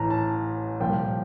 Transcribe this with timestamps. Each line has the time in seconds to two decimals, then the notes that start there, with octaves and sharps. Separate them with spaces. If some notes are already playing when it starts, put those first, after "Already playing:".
Already playing: A1 A2 E3 A5 A#5
0.10 A5
0.80 C2 A#2 F3 G5